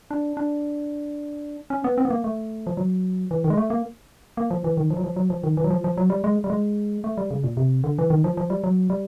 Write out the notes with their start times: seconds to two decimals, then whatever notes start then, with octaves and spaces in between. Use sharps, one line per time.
0.11 D4
0.37 D4
1.70 C#4
1.84 B3
1.98 C4
2.05 B3
2.10 A#3
2.24 A3
2.67 F3
2.77 F#3
3.31 E3
3.44 D#3
3.50 G#3
3.57 A3
3.70 A#3
4.37 A#3
4.51 F3
4.64 E3
4.77 D#3
4.90 F3
4.97 F#3
5.04 F3
5.16 F#3
5.30 F3
5.44 D#3
5.57 E3
5.64 F#3
5.70 F3
5.84 F3
5.97 F#3
6.10 G3
6.24 G#3
6.44 G3
6.50 G#3
7.04 A3
7.18 G3
7.31 C#3
7.44 A#2
7.57 C3
7.84 D3
7.99 E3
8.10 D#3
8.24 F3
8.37 F3
8.50 G3
8.64 F#3
8.90 G3